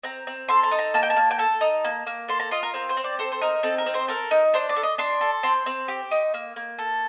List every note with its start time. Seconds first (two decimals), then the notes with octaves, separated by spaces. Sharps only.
0.03 C4 A#5
0.27 C4
0.48 A4 C6
0.63 A#5
0.71 D#4
0.79 A#5
0.94 A#3 A5
1.03 G5
1.10 A5
1.16 A#3
1.30 G5
1.39 A4 A5
1.61 D#4
1.84 A#3
2.07 A#3
2.28 A4 C6
2.40 A#5
2.51 F4 D#5
2.63 A#4
2.74 C4 A#4
2.89 C5
2.97 C4
3.04 D5
3.19 A4 C5
3.32 C5
3.41 D#4 A#4
3.63 C4 A4
3.78 A#4
3.86 C4
3.94 C5
4.08 A4 A#4
4.31 D#4
4.54 D4 C5
4.69 D5
4.76 A4
4.83 D#5
4.98 D4 C6
5.21 A4
5.43 C4 C6
5.66 C4
5.88 G4
6.11 D#4
6.34 A#3
6.56 A#3
6.78 A4